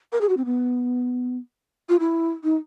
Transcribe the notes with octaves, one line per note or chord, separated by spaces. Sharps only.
A#4
G#4
F#4
C4
B3
F4
E4
D#4